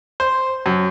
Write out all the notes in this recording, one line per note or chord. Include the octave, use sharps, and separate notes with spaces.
C5
F#2